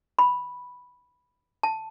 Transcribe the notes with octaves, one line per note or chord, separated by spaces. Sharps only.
B5
A5